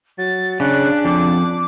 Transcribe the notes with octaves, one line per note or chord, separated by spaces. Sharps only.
F#3 A6
C#3 D4 F#6
F2 D6